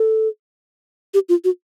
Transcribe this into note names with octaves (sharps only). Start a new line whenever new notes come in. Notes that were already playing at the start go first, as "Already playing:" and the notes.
Already playing: A4
G4
F4
F#4